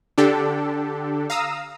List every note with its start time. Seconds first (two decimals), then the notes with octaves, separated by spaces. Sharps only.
0.18 D3 D4 G4 A4
1.30 F5 A#5 D#6 E6